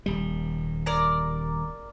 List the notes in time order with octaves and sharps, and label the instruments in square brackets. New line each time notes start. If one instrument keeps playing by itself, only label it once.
[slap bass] D#1 G3
[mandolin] A#4 D5 A#5